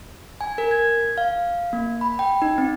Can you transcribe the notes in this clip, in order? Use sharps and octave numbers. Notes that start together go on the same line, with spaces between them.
G#5
A#4
G#6
F5
A#3
B5
G5
D#4
C4